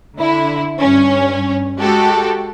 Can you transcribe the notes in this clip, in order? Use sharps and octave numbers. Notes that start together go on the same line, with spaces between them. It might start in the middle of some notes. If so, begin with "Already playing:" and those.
D3 E4
G2 C#4
G#3 F#4 G4 A4